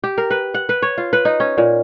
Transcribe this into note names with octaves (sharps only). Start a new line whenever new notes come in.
G4
A#4
B4
F#5
B4
C#5
F4
B4
D#4
C#4
A#2